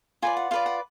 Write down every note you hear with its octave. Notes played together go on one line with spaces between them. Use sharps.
F4 B4 D5 G#5
F#5
F4 B4 D5 F5
F#5